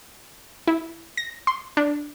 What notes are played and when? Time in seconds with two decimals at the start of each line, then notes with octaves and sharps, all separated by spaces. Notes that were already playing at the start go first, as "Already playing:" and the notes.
0.67 E4
1.17 A#6
1.47 C6
1.77 D4